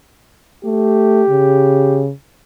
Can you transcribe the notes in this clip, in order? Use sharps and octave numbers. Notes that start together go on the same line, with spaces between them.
A3 G4
C#3